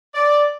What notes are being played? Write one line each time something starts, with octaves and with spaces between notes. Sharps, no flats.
D5